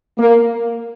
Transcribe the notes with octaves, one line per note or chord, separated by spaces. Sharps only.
A#3